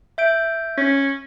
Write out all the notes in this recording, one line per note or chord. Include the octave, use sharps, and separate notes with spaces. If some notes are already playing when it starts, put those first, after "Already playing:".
E5 G6 D7
C#4